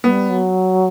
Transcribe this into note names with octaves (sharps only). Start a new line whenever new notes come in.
G3 B3
F#3